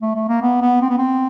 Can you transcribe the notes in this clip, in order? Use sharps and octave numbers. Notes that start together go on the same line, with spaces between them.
A3
A3
A#3
B3
B3
C4
B3
C4